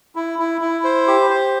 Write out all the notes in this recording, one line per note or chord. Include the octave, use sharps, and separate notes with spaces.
E4
E4
E4
C5
G4
C5